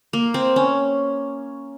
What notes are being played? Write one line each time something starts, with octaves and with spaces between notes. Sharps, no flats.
A#3
C4
C#4